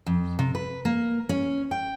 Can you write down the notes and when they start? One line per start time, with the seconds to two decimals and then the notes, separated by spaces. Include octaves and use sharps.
0.06 F2
0.39 C3
0.55 B4
0.85 A#3
1.29 C#4
1.71 G5